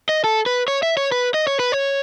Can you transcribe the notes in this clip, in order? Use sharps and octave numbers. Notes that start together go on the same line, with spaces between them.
D#5
A4
B4
C#5
E5
C#5
B4
D#5
C#5
B4
C#5